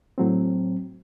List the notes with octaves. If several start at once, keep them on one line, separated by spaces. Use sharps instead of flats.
A2 F#3 C4